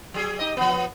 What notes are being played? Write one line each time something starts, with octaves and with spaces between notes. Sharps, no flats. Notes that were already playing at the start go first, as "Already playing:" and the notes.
F#3 G#4
D#4 G4 D#5
F3 B3